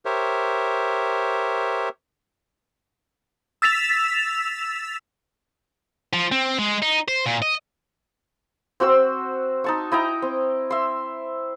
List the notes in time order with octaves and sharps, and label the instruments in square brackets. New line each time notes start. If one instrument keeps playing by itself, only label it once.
[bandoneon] G4 A#4 C5 C#5 E5
[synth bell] E6 A6 B6 E7 F7
[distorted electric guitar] F3
C4
G#3
D#4
C5
A#2
D#5
[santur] C4 F#4 C5 E6
D#4 A5 C#6
E4 D#5 G5 A#5
C4
E5 C6